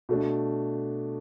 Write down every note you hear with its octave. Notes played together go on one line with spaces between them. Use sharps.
B2 A3 D4